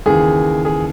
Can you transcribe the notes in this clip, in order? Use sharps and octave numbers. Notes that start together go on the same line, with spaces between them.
D#2 C#3 E3 G#4
G#4